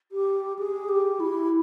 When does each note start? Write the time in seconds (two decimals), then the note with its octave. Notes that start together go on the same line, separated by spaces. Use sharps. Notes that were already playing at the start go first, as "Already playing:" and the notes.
0.12 G4
0.59 G#4
0.89 G4
1.20 E4